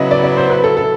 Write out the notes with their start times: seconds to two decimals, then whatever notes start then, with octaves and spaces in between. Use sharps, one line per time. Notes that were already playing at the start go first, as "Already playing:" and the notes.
Already playing: C#3 F#3 B3 E4 D#5
0.11 D5
0.24 D5
0.37 C5
0.50 B4
0.64 A4
0.77 A4